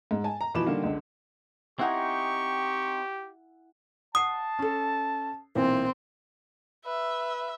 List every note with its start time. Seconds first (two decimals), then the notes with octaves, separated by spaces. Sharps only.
0.11 G#2
0.24 G#5 A5
0.41 A#5
0.54 B2 E3 F3 B5 D6 E7
0.67 D3 D#3 G3 A#3
0.84 C#2 D3
1.79 C4 D#4 E4 G4 F#5 G#5 C#6
4.15 F#5 A5 D#6 C7
4.59 C#4 A4
5.55 B1 A#2 E3 C4
6.86 B4 E5